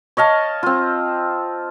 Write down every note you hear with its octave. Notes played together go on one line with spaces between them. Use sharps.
C#5 D#5 F5 A5
C4 F4